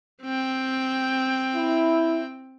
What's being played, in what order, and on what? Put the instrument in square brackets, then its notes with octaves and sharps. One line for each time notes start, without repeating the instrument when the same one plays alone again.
[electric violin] C4 G5
[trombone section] E4